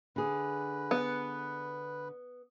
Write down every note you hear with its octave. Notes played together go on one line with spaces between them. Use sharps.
D3 G#4 B4
B3